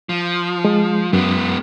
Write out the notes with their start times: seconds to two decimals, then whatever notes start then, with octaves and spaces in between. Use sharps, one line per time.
0.09 F3
0.65 G#3
1.13 F#2 G#3 B3